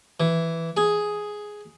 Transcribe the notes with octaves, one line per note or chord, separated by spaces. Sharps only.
E3
G#4